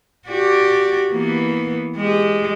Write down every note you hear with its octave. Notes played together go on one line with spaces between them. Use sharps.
F#4 G4 D5
E3 A#3 B3
G#3 G4